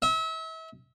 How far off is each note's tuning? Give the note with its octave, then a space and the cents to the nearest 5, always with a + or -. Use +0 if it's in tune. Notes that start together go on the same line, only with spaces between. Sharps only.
E5 -35